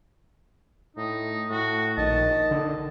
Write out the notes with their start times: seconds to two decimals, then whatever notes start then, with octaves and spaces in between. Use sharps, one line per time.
0.97 A2 D#4
1.50 A2 F#4
1.98 A#1 D#3 D#5 A5
2.51 D3